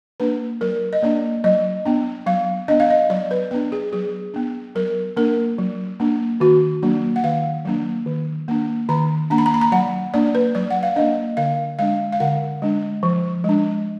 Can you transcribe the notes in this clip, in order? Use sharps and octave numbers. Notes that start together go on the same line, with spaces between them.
A#3 D4 B4
F#3 A#4
D#5
A#3 D4 D5
F#3 D#5
B3 D4
F#3 F5
B3 D4 D#5
F5
D#5
F#3 D5
B4
B3 D4 B4
G#4
F#3 G#4
B3 D4
F#3 A#4
A#3 D4 A#4
F#3
A#3 D4
D#3 F#4
F#3 A#3 D4
F#5
D#3 F5
F#3 A#3 D4
D#3
A#3 D4
D#3 A#5
A#3 D4 A#5
B5
A#5
B5
A#5
F#3 F#5
A#3 D4 D5
B4
F#3 D5
F#5
F5
A#3 D4 D#5
D3 F5
G#3 D4 F5
F5
D3 F#5
G#3 D4
F3
G#3 D4